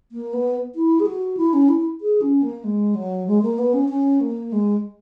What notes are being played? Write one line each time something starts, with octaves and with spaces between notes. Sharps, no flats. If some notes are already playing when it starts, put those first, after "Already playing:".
A#3
B3
E4
G#4
F#4
E4
C#4
E4
G#4
C#4
A#3
G#3
F#3
G#3
A#3
B3
C#4
C#4
A#3
G#3